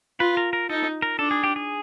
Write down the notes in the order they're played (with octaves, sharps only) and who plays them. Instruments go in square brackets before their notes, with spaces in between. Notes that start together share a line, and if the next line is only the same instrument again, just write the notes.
[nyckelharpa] F4 [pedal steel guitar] B4
[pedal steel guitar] A#4
A#4
[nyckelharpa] D#4 [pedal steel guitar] A4
[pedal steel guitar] A#4
[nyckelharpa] D4 [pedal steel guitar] A4
[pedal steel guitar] G#4
G4
G#4